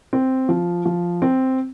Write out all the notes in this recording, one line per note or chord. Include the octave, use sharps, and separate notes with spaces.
C4
F3
F3
C4